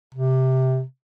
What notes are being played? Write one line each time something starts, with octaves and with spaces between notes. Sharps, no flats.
C3